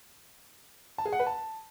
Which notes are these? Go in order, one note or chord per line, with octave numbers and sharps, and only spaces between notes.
A5
G#4
F#5
B4
A5